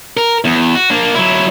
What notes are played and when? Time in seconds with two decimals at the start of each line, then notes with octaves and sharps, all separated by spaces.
0.17 A#4
0.45 E2
0.75 F#4
0.90 A#3 D4
1.15 F#3 E4